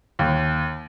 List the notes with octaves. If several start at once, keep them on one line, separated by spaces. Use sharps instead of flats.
D#2